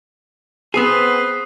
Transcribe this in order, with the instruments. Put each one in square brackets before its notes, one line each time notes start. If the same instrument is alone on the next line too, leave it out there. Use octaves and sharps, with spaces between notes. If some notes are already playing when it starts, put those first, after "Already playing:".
[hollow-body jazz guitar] B3 C4 G#4 [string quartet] B4 C5 [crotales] D#6 C7